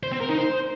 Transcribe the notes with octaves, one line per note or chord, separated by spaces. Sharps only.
C5
C4
A#4
D#4
C5